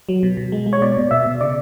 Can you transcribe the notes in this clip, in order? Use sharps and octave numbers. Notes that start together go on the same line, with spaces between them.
F#3
B2
B2
G#3
G#3
C#5
B2 D5
B2
B2 E5
B2
C#3 D5